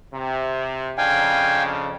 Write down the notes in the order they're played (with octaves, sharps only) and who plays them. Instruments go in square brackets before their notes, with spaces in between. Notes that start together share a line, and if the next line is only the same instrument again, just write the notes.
[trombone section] C3
[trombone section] F2 C#3 D4 [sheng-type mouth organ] F5 G5 G#5